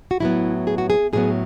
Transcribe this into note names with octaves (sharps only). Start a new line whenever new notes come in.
F#4
A2 F#3 B3 E4
G#4
F#4
G#4
A2 F#3 B3 G#4